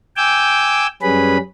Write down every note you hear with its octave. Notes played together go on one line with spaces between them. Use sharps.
G5 G#5 D6 E6 G6
F#2 G3 C#4 G#4 B4 B5